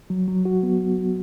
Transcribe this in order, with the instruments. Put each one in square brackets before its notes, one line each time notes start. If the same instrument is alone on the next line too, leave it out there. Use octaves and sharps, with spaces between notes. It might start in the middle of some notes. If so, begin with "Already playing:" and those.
[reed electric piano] F#3
F#3
F#4
B3